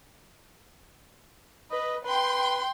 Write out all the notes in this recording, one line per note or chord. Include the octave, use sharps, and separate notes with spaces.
B4 D#5
B4 G5 C6